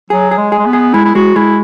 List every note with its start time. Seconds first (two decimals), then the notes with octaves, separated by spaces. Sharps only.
0.10 F#3 G#4
0.31 G#4
0.38 G#3
0.52 G#4
0.59 G#3
0.66 B3
0.73 G#4
0.94 G#3 E4
1.05 E4
1.15 G#3 F#4
1.36 G#3 E4